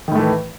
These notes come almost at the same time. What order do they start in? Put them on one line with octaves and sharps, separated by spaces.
D#3 A2 A3 E3